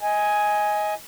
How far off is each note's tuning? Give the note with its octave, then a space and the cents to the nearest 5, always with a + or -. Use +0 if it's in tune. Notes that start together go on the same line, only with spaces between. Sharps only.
D#5 +20 G#5 +0